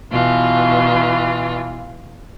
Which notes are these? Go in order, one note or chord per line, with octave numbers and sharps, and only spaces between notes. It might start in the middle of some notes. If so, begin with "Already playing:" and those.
B2 E3 F4